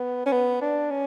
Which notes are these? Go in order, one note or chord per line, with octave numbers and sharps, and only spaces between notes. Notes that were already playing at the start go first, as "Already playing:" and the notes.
Already playing: B3
C#4
B3
D4
C#4